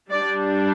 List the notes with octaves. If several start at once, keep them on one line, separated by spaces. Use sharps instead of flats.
G3 D4 D5